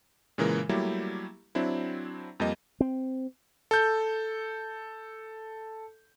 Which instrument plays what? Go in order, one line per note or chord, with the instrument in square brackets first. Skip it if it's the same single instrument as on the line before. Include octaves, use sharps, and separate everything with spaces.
[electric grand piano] A#2 C#3 E3 G#3 A#4
F#3 G3 A3 A#3 E4 G4
F#3 C4 D4 E4
F2 G3 A#3 D#5
[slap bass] C4
[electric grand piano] A4 G6